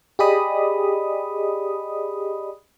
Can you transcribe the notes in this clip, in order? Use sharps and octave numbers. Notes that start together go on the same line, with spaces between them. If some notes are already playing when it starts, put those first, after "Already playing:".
G4 G#4 D5 D#5 B5 D#6